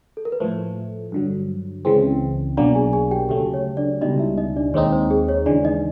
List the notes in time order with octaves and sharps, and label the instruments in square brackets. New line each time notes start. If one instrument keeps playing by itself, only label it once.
[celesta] A4
A#4
B4
[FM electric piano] A2 F3 A3 [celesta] C5
[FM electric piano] G2 D3 F#3
C#2 C#3 E3 G#3 C4
[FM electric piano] B1 B2 F#3 A#3 [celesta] D4 D5
[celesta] G#4 G#5
G#4 G#5
G4 G5
[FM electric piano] D2 C#3 F#3 A3 [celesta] G4 G5
[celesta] C#5
D4 D5
[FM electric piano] C#2 B2 G3 [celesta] D#4 D#5
[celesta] E4 E5
D#4 D#5
D4 D5
[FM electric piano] D#2 D#3 G#3 C4 D#4 [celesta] C#5
[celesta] C5
G#4
C#5
[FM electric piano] D#2 C#3 E3 G#3 [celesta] D4 D5
[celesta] D#4 D#5